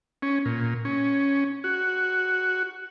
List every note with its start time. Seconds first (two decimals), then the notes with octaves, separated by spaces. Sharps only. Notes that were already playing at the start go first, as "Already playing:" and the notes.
0.22 C#4
0.45 A#2
0.85 C#4
1.64 F#4